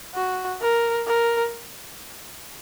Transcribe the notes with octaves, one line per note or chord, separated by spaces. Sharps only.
F#4
A#4
A#4